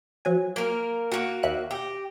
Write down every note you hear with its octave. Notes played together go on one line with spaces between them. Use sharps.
F3 F#3 G#5
A#3 A#4
A#3 F#4
D#2 E5 F#6
G4 G5 A#6